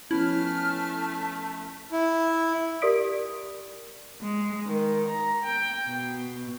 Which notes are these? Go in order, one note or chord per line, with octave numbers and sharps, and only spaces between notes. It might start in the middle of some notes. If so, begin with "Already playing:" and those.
F3 A3 B3 C#4 E4 F6
E4
G4 A#4 D5 D#6 B6 D7
G#3
D#3
A#5
G5
B2